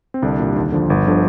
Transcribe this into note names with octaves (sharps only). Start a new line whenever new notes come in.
C4
C2 D3 D4
A#2 G3
D#2
D3 F3
G1
D3 F3